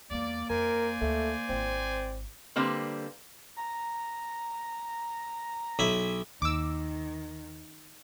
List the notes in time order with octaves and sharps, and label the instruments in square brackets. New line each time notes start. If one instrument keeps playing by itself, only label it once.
[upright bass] E2 G#3 [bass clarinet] A#3 [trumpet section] D5
[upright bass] F2 [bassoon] A#4 [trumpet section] C5 D5 G#5
[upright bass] D2 [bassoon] A3
[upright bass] G#1 E4 [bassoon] C4
[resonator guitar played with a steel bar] D3 G3 A#3 C4 B4
[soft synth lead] A#5
[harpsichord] B1 E4
[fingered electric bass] D#2 [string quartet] D#3 [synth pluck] D6 E6